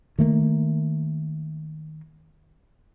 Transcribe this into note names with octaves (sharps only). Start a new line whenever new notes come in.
D#3 A3 A#3